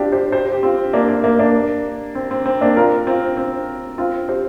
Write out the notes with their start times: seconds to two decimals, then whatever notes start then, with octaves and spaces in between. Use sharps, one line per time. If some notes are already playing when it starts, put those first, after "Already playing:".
Already playing: C4 D4 F4 G4
0.12 G4 C5
0.32 G4 C5
0.52 G4
0.63 C4 F4
0.93 A#3 D4
1.08 A#3
1.24 A#3
1.39 A#3 D4
2.15 C4
2.31 C4
2.46 C4
2.61 A#3 D4
2.76 F4 A#4
3.07 C4 F4
3.37 C4
3.98 C4 F4
4.29 G4 C5